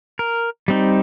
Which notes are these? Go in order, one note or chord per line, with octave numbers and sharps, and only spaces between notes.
A#4
G3 C4 D#4